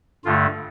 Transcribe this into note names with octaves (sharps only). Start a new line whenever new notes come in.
G2 D3 A3 F4